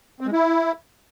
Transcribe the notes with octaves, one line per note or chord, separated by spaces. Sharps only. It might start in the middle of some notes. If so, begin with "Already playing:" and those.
C4
G#3
E4